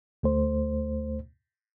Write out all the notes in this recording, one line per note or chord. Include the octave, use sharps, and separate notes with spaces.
D2 A3 C5